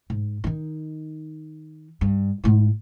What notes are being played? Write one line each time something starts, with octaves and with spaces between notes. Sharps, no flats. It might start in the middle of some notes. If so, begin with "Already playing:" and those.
G#2
D#3 D#4
G2
G#2 E4